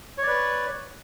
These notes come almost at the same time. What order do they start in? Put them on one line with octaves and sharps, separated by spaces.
C#5 D5 B4